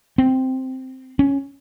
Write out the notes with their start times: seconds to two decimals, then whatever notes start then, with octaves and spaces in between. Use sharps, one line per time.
0.18 C4
1.19 C#4